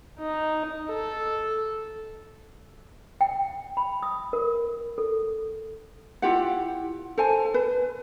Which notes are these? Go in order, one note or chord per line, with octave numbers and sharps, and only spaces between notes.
D#4
A4
G5
B5
D#6
A#4
A4
E4 F4 G4 F#5
A4 C5 G#5 A5
B4